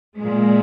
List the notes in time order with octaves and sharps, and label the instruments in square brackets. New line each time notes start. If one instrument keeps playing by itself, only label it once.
[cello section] A#2 G#3